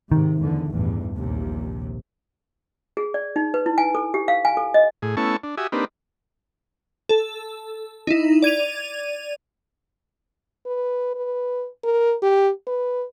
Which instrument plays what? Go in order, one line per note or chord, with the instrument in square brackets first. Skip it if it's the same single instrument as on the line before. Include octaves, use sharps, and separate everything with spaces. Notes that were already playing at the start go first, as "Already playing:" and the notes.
[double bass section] G#2 C3 [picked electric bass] D#3
[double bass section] F1 E2 D3
A1 E2 G2
A#1 D#2 C3
[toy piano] G#4
D5
D#4
B4
E4
G#5
A4
G4
F5
G#5
A4
D#5
[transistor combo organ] A2 G#4
A3 B3 C#4 E4 A5 C#6
D4
F#4 G4 E5 G#5 D#6
A#3 C4 D4 D#4 G4 B4
[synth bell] A4
D#4 E4
D5 G#6 D#7 F7
[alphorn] B4
B4
A#4
G4
B4